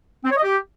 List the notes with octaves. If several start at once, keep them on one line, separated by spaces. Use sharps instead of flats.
C4
C#5
D#5
G4